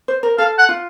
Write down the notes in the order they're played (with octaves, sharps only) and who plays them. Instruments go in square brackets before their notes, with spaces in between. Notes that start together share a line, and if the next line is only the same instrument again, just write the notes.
[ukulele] C5
A#4
[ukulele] A4 [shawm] F5
[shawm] F#5
[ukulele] F4